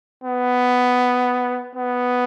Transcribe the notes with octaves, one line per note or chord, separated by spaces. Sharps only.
B3
B3